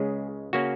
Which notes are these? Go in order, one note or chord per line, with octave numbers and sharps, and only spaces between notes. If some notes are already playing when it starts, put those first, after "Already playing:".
Already playing: C#2 C#3 G#3 C#4 G#4
C#3 A#3 C#4 F#4